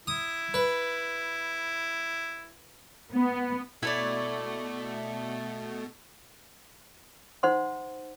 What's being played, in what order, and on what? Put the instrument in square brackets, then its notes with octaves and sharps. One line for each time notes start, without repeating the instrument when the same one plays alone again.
[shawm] E4 [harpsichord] D#6
[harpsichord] B4
[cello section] B3
[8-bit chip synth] B2 [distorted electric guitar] A3 [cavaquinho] E4 C#5 D5
[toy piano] D#4 C5 F#5 C6